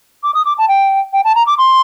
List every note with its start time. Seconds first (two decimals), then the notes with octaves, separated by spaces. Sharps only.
0.23 D6
0.34 D#6
0.46 D6
0.58 A5
0.68 G5
1.13 G5
1.25 A5
1.35 A#5
1.47 D6
1.58 C6